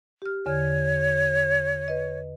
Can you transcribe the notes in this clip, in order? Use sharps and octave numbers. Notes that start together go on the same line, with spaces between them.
G4 F6
E2 D3 C#5 F6
B4 D#5